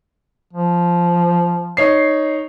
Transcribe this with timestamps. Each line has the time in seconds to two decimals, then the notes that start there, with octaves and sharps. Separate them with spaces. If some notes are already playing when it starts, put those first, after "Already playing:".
0.53 F3
1.77 D#4 C#5 C7